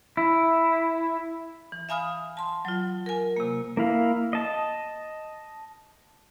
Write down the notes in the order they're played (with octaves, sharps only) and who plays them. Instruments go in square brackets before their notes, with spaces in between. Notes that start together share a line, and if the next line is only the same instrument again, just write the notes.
[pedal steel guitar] E4
[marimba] E3
E5 F5 G#5 B5 D#6 F6
A5 C6
F#3 F4
A#4 G#5
C3 A#3
[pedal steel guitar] A#3 E4 F5
D#5 A5